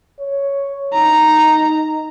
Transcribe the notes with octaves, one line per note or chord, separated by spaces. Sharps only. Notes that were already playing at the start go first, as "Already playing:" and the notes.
C#5
D#4 A#5